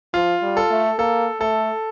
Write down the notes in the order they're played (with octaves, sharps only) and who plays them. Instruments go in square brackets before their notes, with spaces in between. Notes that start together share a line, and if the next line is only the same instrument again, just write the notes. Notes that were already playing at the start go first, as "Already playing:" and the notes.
[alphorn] F3 [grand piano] F4
[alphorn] G3
[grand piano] A4
[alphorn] A3
[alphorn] A#3 [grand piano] A4
[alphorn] A3 [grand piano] A4